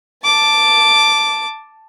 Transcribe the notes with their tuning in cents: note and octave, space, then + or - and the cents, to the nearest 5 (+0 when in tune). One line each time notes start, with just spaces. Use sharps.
A5 +0 D6 +0